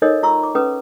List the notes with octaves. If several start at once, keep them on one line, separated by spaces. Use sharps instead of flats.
D#4 A4 A#4 C5 C#5 D#5
F4 A#5 C#6 E6
D6
C#4 A4 B4 D#6